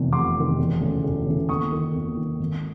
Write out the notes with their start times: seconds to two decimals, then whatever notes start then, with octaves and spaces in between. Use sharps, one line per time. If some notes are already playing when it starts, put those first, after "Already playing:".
Already playing: F1 E2 C3 D#3
0.13 F1 C6 D6
0.36 E2 C3 D#3
0.58 E1
0.81 D2 C#3 E3
1.03 E1
1.27 D2 C#3 E3
1.49 D#2 C#6 D#6
1.72 D#3
1.95 D#2
2.17 D#3
2.39 G#1